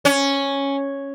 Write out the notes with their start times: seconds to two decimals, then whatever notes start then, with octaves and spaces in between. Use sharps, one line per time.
0.05 C#4